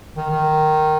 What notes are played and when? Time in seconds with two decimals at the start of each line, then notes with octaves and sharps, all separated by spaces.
0.17 D#3
0.30 D#3